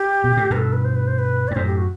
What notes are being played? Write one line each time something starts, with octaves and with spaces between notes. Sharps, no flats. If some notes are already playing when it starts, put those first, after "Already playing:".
Already playing: G4
B2
A2
G2 B2 B4
A4
B4
C5
B4
C5
B4
D5
G2
F#2 A2 C5
G4
F#4